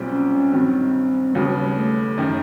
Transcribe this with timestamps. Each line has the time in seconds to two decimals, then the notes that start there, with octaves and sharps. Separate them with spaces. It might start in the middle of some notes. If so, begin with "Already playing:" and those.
Already playing: B1 A#2 G3 C4
0.11 C#4
0.52 G2 D#3 F#3 C4
1.35 D#2 C#3 F#3 G3 B3
1.76 A3
2.18 F#2 D#3 G3